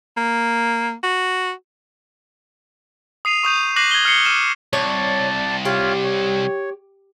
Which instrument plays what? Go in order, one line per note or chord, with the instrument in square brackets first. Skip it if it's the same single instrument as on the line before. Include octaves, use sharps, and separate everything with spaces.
[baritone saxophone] A#3
F#4
[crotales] D#6 C7 D#7 F7
C#6 D#6 G6 D#7
D6 F#6 A#6 C7 D#7 F#7
G#6 G7
F6 C7 C#7 G7
F6 D#7 E7
[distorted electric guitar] C2 [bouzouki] C#5 [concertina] D5 A5
[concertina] F4 C#5 [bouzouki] G4
[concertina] C#5